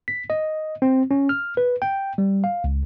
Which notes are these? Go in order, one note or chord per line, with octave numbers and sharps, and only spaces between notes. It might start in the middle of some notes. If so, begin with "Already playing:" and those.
B6
D#5
C4
C#4
F6
B4
G5
G3
F5
C#2